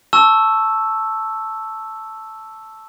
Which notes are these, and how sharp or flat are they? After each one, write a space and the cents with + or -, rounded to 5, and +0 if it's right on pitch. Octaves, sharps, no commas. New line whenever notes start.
A5 +0 C#6 +0 E6 +0